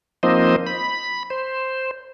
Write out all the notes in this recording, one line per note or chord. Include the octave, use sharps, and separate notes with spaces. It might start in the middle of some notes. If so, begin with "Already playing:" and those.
F3 A#3 C4 D#4 C5 D#5
B5
C5